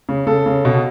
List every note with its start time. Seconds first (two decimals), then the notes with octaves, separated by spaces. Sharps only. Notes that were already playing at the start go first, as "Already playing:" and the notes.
0.09 C#3
0.27 C#3 A4
0.46 C#3
0.65 B2